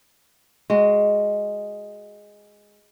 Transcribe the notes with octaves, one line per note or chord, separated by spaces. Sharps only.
G#3 F#4